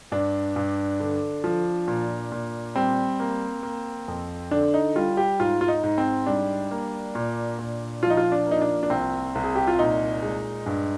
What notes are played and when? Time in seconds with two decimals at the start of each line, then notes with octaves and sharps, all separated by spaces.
0.12 G2 D4
0.56 G2
1.00 D3
1.44 F3
1.88 A#2
2.32 A#2
2.76 G3 C4
3.20 A#3
3.63 A#3
4.08 F2
4.51 D3 D4
4.74 D#4
4.96 G3 F4
5.17 G4
5.40 G#2 F4
5.61 F4
5.68 D#4
5.83 G#2
5.98 C4
6.27 G3 D4
6.71 A#3
7.15 A#2
7.59 A#2
8.03 F3 F4
8.10 D#4
8.17 F4
8.32 D4
8.46 A#3
8.51 D#4
8.62 D4
8.83 D4
8.90 C2 C4
9.35 C2
9.43 G#4
9.55 G4
9.67 F4
9.79 A#2 D#4
10.22 G#3
10.66 G2